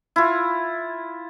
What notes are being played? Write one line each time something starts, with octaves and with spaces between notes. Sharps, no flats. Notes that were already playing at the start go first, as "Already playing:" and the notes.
E4 F4